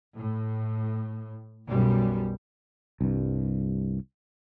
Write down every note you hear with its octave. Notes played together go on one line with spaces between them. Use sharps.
A2
B1 F#2 G3
C2 G2